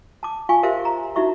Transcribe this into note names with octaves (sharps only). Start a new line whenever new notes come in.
A5 D6
F4 F5 G#5 C#6
G4 A#4 C5 E5 F5
A#5
D#4 E4 F#4 E5 C#6